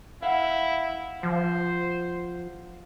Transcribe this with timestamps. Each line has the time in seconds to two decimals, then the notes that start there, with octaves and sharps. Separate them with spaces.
0.22 E4 F5 F#5
1.23 F3 C5